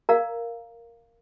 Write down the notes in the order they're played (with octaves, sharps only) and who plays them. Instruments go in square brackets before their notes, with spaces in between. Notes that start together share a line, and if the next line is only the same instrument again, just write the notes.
[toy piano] A#4 D5 F5 A#5